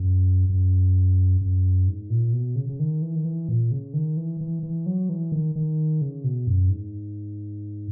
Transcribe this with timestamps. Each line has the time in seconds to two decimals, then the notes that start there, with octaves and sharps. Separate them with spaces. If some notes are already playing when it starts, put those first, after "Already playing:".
Already playing: F#2
0.49 F#2
1.41 F#2
1.88 G#2
2.10 A#2
2.33 B2
2.55 C#3
2.69 C#3
2.79 D#3
3.02 E3
3.15 D#3
3.25 E3
3.49 A#2
3.71 C#3
3.93 D#3
4.17 E3
4.41 E3
4.63 E3
4.86 F#3
5.09 E3
5.32 D#3
5.56 D#3
6.01 C#3
6.24 B2
6.47 F#2
6.70 G#2